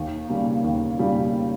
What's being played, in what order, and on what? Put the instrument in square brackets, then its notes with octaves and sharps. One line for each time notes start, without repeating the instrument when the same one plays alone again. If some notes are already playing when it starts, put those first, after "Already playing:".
Already playing: [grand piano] D#2
C#3 G3 A#3
D#2
C#3 G3 A#3